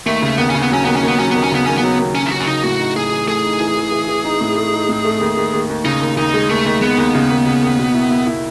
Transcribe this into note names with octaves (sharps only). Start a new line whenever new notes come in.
D#2 A3
C#3
D#2 B3
C#3 C#4
B3
F#3 C#4
D#2 B3
C#4
D#2 B3
F#3 C#4
D#2 B3
C#4
C#3 B3
D#2 C#4
B3
F#3
D#2
F#3 C#4
E4
F#3 F#4
C#4
C#3 D#4
A2 F#4
D#4
A2 G#4
E3
A3 G#4
D#4
E3
E3
E3
E3
D#4
A2
A3
D#4
A2
A3
D#2
D#2
D#2
D#2
C#3 D#4
D#2
D#2 D#4
G#3
D#2 A3
D#2
G#3 B3
D#2
C#3
D#2
C#3
D#2
B2
E4
E4
E4